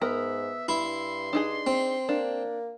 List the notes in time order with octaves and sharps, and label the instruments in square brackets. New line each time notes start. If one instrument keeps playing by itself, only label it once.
[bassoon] G#2 [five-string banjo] B3 A#4 [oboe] E5
[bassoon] G2 [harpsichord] E4 [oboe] C6
[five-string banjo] D4 D#4 G#4
[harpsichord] C4
[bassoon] A#3 [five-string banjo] D4